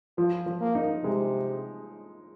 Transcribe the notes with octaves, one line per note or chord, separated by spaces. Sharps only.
F3 F4
F3
A#3
D#4
C3 G#3